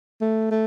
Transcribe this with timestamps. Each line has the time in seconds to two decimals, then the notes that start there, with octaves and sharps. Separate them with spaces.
0.21 A3
0.51 A3